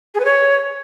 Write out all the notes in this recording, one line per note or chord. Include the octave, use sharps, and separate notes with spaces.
G#4
B4
C#5